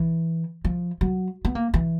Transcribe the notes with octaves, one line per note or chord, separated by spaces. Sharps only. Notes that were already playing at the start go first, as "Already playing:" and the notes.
Already playing: E3
F3
F#3
B3
A#3
E3